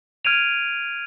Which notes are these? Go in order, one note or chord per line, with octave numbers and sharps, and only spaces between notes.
F6 G#6 D7 D#7 F7